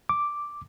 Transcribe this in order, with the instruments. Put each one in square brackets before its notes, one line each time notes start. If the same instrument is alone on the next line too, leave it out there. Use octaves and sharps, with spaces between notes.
[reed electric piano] D6